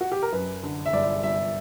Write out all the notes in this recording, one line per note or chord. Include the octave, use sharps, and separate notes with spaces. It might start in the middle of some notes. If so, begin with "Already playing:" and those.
F#4
G4
A#4
F#2 B4
D3
E5
G1 D5
G1 E5